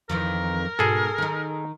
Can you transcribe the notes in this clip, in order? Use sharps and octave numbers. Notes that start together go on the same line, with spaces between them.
F2 D#3 E3 A#4
G#2 B2 G#4 A4
D#3 D#4